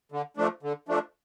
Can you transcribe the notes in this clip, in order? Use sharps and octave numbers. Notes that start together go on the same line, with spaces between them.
D3
F3 A3 D4
D3
F3 A3 D4